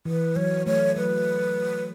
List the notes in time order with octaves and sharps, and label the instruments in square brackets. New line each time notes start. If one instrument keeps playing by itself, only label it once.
[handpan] E3 [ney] B4
[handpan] F#3 [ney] C#5
[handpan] A3 [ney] C#5
[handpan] F#3 [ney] B4